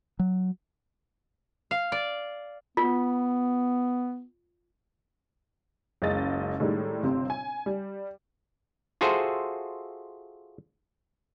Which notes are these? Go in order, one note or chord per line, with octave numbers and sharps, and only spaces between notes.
F#3
F5
D5
B3 F4
F#1 C#2 G#3 D#5 A6
A2 D#3 G3 G#3
G1 C3 C4
G#5
G3
F4 F#4 G#4 A4 C5 E5